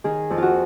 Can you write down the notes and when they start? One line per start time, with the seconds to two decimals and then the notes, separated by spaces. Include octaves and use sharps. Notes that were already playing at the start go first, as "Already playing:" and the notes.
0.04 D#3 G#4
0.30 F2
0.38 F4 F#4